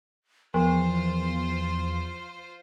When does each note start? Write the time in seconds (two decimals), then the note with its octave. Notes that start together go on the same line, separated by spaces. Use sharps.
0.54 E2 F3 F4 C5 C6